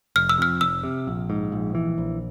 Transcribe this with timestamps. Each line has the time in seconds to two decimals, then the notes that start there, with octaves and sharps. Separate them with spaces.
0.16 F1 F6
0.29 E6
0.38 F2 F6
0.61 F1 E6
0.83 C3
1.07 A#1
1.30 G#2
1.52 A#1
1.75 E3
1.98 A#1